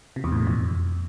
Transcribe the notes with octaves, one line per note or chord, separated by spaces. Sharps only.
C3
E2
A2
B2
F2